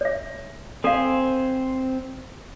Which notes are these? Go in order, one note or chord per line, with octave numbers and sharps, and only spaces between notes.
C#5 E5
C4 A4 C5 F5 G#5